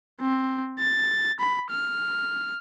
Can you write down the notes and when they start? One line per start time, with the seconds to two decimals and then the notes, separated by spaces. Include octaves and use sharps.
0.21 C4
0.79 A6
1.40 B5
1.70 F6